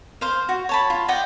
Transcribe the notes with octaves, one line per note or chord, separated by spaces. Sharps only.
C5 F5
F#4
C#5 A5 B5
F4
D5 D#5 F#5 G5